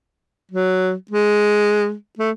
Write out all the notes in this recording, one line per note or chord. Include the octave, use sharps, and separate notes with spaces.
F#3
G#3
A3